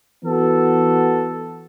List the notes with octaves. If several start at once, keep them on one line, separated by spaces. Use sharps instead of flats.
E3 B3 F#4 A4